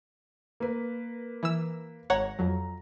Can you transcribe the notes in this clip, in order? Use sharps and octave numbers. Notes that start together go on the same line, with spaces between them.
A#3 B4
E3 E6
G#1 C#5 F#5 A#5
F2 F#3